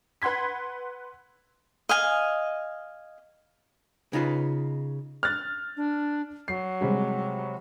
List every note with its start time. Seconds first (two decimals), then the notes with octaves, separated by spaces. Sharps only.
0.22 B4 F#5 C6 G#6 B6
1.89 D#5 F5 G#5
4.13 C#3 D#4 F4 B4
5.23 F6 F#6 A6
5.77 D4
6.48 F#3 C7
6.81 C3 G3 G#3